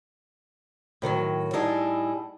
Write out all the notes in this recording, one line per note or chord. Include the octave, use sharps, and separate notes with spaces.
A2 D#3 E3 F#3
A2 G3 D#4 E4 G#4 A5